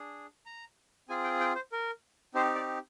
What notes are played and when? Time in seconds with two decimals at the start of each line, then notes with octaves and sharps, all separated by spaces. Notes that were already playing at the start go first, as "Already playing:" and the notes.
Already playing: D4 G#4
0.46 A#5
1.09 C4 F4 G#4 G#5
1.24 G5
1.40 G5
1.55 C5
1.72 A#4
2.34 C4 D#4 G4 C5
2.55 D5